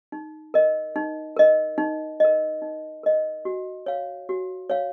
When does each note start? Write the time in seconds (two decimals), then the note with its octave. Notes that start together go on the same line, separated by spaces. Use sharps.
0.12 D#4
0.54 A#4 D#5
0.96 D#4
1.37 A#4 D#5
1.78 D#4
2.20 A#4 D#5
2.62 D#4
3.03 A#4 D#5
3.45 F#4
3.86 C#5 F5
4.29 F#4
4.70 C#5 F5